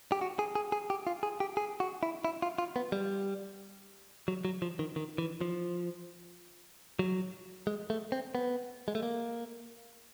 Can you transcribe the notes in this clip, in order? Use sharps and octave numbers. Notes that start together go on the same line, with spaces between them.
G4
F#4
G#4
G#4
G#4
G4
F4
G#4
G4
G#4
F#4
E4
E4
F4
F4
B3
G3
F#3
F#3
F3
D#3
D#3
E3
F3
F#3
G#3
A3
C4
B3
G#3
A3
A#3